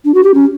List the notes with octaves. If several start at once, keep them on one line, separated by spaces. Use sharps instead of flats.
D4
F#4
G4
C#4